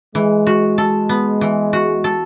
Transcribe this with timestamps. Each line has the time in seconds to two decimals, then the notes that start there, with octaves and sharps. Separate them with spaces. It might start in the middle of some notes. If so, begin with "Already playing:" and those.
0.15 E3 G#3
0.47 F#4
0.78 A4
1.09 B3
1.41 E3
1.73 F#4
2.04 A4